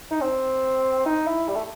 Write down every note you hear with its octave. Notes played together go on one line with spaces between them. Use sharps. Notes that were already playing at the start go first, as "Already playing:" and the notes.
D#4
C4
D#4
E4
G3
A3